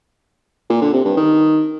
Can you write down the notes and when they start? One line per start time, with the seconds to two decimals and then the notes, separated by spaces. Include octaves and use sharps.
0.70 A#2
0.81 D3
0.93 C3
1.05 G2
1.16 D#3